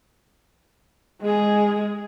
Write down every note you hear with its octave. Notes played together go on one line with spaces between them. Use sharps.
G#3 G#4